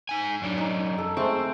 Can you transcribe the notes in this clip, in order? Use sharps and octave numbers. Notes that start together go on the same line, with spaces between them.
D#4 G#5
F#2 D4
D#4
A4
G#3 A3 C4 C5